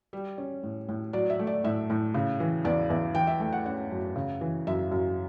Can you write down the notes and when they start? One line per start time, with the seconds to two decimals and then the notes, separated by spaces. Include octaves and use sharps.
0.13 G3
0.38 C#4
0.63 A2
0.89 A2
1.13 F#3 D5
1.30 E5
1.39 A3
1.47 D5
1.64 A2 E5
1.90 A2
2.14 C#3
2.40 E3
2.65 E2 D5
2.90 E2 E5
3.15 E3 G5
3.27 E5
3.40 A3 G5
3.52 F#5
3.65 C#4 F#5
3.91 F#2
4.16 C#3
4.41 E3
4.67 F#2 E5
4.91 F#2